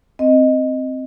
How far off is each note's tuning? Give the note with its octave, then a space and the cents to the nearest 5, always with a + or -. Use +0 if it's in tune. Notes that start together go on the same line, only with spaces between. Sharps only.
C4 +0 D#5 +0